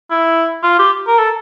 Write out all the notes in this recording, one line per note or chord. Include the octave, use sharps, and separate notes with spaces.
E4
F4
G4
A#4
A4